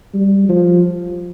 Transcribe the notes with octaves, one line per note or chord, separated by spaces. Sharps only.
G3
F3